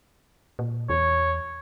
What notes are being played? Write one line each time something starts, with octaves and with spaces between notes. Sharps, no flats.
A#2
E2 C#5